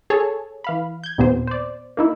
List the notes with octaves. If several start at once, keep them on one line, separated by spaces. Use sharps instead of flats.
G#4 A4 C#5 G#5 A5
E3 F5 B5
G6 G#6
D#2 A#2 B3 C4 C5
C5 D5
A#3 D#4 E4